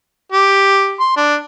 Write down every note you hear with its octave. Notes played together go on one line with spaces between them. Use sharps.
G4
C6
D4